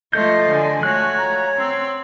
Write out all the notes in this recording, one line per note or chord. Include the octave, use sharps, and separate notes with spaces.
F3 A3 F4 A4 D#5 G6
D3 G#5
A3 F#4 C#5 F#6
F4 A#5
C4 C6 E6